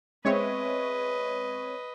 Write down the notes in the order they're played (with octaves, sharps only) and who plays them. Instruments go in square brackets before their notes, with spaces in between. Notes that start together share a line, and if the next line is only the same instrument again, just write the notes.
[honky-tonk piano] G#3 B3 E5 [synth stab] C4 C#5 [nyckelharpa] B4 D#5